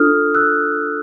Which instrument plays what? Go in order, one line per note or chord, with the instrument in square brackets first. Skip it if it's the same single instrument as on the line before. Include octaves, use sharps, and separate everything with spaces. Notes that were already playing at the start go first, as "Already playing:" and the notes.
Already playing: [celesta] D4 F4 A4 D#6 F6
E6 F#6